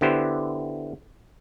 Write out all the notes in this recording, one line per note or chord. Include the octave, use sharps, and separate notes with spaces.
D3 B3 E4 G4 C5